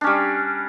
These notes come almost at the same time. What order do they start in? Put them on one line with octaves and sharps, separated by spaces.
D4 C#4 G3